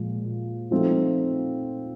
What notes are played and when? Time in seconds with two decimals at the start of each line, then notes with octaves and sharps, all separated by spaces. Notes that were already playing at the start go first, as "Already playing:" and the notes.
Already playing: A#2 F3 G#3
0.71 F3 A3 C4 D#4